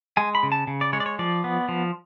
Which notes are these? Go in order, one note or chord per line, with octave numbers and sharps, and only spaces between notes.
G#3 G#5
B5
C#3
A5
C#3
D5
G#3 C#5
D5
C#5
F3 D5
B3
F3